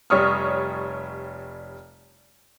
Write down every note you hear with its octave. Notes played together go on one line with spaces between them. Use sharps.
F1 G3 C#5 C#6 D#6 F6